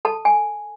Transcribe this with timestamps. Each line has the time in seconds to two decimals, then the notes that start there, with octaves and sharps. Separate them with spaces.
0.05 A4 A5
0.25 G#5